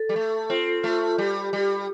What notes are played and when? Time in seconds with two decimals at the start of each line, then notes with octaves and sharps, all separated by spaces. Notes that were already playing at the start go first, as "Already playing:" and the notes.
Already playing: A4
0.09 G3
0.16 A3
0.50 C4 F4
0.84 A3 F4
1.18 G3 G4
1.53 G3